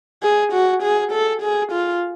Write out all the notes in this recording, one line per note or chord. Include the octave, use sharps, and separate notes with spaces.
G#4
F#4
G#4
A4
G#4
F4